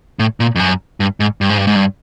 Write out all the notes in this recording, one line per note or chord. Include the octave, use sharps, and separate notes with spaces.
A2
A#2
F2
F#2
G2
G#2
G2
G#2
G2
G#2
G2